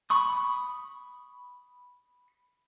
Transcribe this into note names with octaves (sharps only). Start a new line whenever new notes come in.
B5 C#6 D#6